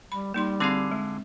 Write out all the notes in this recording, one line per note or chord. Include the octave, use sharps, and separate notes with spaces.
G3 B5
G3 A#3 D#4 C6
D3 C4 G#4 F5 C6
G#3